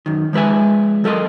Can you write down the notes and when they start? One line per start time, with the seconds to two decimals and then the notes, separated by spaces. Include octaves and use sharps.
0.06 F#2 D#3
0.33 F3 G#3 B4 E5 G#5
1.04 F#3 A4 A#4 D#5 C6